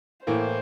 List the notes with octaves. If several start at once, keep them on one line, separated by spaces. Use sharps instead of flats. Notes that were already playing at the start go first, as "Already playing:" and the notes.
A2 E3 A#3 C5